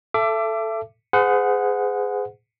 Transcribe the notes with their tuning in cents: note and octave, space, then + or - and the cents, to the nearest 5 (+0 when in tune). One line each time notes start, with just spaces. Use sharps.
A4 +0 E5 +30 D6 +0
G#4 +0 C5 -45 F#5 -15